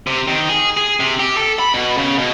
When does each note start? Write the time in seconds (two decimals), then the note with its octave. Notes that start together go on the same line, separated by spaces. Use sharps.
0.07 C3
0.28 D#3
0.49 G#4
0.77 G#4
1.00 C3
1.20 G4
1.37 A4
1.59 B5
1.74 B2
1.98 C#3
2.19 B2